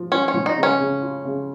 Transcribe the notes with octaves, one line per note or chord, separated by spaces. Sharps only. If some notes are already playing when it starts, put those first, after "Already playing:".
Already playing: F3
C#4 F4
C#4
F3
D#4
C#3
C#4
C#3
F4
C#3